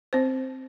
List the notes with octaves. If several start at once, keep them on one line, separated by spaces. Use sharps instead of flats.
C4 C5